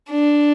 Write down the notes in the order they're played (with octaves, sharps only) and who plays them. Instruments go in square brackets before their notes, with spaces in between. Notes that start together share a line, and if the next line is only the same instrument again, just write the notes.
[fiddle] D4